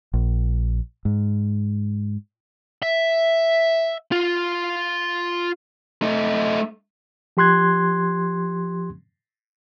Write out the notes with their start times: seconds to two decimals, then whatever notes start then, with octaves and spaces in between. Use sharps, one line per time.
0.14 A#1
1.05 G#2
2.83 E5
4.12 F4
6.02 A3 D#4
7.37 F3 G4 C6 F#6 G#6